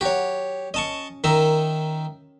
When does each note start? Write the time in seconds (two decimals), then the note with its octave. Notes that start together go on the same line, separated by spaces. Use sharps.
0.01 F#3 F#4 G4 C#5
0.74 C#4 D#5 A5 C#6
1.24 D#3 D#4 A#4 E5